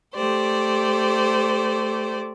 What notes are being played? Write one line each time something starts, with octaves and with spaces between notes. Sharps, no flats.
A3 G4 C5 D5